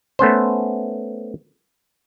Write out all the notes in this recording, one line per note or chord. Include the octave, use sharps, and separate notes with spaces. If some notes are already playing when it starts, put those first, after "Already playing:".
A3 B3 C#4 C5